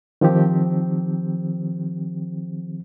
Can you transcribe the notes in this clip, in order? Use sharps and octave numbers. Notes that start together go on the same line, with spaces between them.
D#3 F3 C4 G4